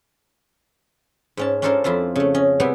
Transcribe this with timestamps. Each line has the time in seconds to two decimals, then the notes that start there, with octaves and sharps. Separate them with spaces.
1.37 G#2 C#4 A5
1.62 C#4 D4 F4 A4 A#4 C5
1.84 F2 E4 F4 C5
2.16 C#3 A3
2.34 C#4 D#5
2.60 C3 G3 B3 E4 G5 G#5